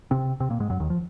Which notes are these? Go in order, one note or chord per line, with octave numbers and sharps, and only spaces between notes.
C3 C4
C3 C4
A#2 A#3
G#2 G#3
F#2 F#3
D#2 D#3
F3